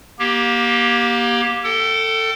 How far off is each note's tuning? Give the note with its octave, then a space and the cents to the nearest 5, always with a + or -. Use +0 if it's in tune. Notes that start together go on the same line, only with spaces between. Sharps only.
A#3 +30 G4 +0
A4 +20 G5 -30